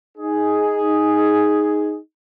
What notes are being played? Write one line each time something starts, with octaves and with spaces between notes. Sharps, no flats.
D#4 G#4